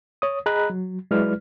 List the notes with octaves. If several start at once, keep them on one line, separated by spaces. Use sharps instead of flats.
C#5 D#6
G#4 D#5 A#5 B5 F#6
F#3
F#3 G#3 E4 B4 D5 F6